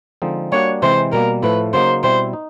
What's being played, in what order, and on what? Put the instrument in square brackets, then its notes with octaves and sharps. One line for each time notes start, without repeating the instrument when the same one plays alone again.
[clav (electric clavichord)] D3 F3 G#3 C4 D#4
[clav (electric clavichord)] G3 A#3 D4 F#4 [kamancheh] C#5
[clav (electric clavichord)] C3 E3 G#3 C4 [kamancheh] C5
[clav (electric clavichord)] B2 G3 A#3 [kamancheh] A#4
[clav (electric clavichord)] A2 F3 A3 [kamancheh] B4
[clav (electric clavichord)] C#3 F#3 A#3 D#4 [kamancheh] C5
[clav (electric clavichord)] B2 G3 C4 E4 [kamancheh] C5
[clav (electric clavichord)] D#4